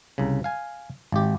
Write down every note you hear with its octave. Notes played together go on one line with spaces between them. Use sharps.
C2 C#3
F5 G#5
G#1 G4